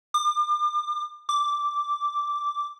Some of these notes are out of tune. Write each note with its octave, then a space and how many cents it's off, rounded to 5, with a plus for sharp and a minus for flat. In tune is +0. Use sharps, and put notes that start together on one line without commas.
D6 +40
D6 -5